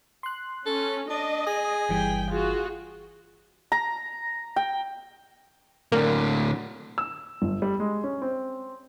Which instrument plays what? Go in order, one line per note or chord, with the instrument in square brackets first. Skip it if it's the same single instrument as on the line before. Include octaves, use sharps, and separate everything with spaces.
[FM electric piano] C6 F#6
[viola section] C#4 [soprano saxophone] A4
[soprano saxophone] D4 [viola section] D#5
[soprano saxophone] G#4 [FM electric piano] D#6
[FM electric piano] G1 E3 G3 [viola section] G5
[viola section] F4 F#4 G#4
[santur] A#5
G5
[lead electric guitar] A2 D3 [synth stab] A#3
[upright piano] E6
G1
G3
G#3
C#4
C4